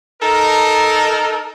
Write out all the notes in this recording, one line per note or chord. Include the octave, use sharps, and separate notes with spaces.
D#4 A4 A#4